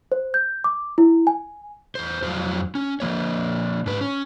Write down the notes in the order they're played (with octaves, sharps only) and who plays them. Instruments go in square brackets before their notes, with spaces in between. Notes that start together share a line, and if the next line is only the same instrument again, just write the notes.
[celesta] C5
G6
D6
E4
G#5
[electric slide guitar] E2 C5
F2 F#3 C5
C#4
F3 A#3 C#5
G#2 B4
C#4